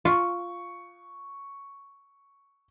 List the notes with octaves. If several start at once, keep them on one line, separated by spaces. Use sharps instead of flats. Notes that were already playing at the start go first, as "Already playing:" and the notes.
F4 C#6